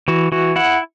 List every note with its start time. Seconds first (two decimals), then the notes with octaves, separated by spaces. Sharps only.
0.08 E3 F#4
0.32 E3 F#4
0.56 E4 F#5